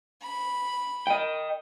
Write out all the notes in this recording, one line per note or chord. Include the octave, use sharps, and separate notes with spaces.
B5
D#5 G5